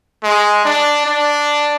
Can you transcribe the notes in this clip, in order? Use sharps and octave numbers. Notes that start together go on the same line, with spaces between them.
G#3
D4
D4